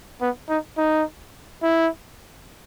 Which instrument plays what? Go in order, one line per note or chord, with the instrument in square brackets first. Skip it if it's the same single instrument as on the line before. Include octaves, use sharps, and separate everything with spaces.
[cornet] B3
D#4
D#4
E4